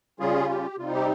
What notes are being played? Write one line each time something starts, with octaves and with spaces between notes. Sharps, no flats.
C#3 G3 C#4 F4 G#4
G4
C3 G3 C4 D#4 F4
G4